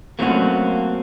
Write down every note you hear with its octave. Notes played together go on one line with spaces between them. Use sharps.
F#3 A3 A#3 C4 C#4 F#4